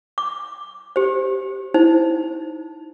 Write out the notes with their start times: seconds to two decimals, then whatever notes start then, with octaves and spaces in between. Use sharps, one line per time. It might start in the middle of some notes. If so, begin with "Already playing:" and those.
0.18 D6
0.96 G4 C5
1.74 D#4 E4 C5